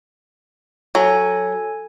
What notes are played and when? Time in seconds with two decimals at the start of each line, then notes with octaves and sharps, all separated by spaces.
0.95 F#3 A4 G#5